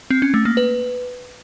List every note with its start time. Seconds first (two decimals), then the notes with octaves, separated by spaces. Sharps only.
0.10 C4
0.22 C#4
0.34 A3
0.45 A#3
0.57 B4